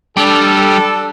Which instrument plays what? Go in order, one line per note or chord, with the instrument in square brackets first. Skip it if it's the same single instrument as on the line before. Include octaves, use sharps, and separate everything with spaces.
[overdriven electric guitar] G3 [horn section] D4 A4